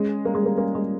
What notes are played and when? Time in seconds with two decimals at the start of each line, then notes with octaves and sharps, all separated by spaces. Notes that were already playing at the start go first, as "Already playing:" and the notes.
Already playing: G#3 C#4
0.09 G#4
0.25 G3 A#3
0.35 G#3
0.42 G3 A#3
0.58 A#3 C#4
0.75 G#3 G#4